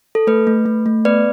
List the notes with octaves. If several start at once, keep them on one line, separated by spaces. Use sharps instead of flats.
A4
A3 B4
A3
A3
A3
B3 B4 D5